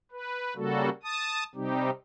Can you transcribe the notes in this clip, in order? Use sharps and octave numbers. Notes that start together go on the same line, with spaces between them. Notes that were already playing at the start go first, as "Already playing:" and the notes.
B4
C#3 G3 A#3 F#4 A4
A5 D#6
C3 G3 C4 D#4 G4